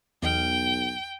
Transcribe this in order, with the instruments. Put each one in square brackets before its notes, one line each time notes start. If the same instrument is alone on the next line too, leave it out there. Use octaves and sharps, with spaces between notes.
[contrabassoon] B1 [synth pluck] E2 D#5 F6 [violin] G5